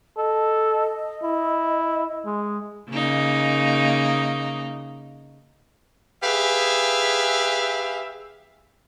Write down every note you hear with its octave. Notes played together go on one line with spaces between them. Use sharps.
A4 D#5
E4
G#3
C#3 A#3 D#4
G4 G#4 B4 E5 F5